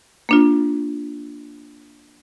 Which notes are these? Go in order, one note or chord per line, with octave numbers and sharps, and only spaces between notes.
A#3 D4 F4